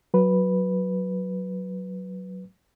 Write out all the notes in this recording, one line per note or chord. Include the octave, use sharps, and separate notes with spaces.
F#3 B4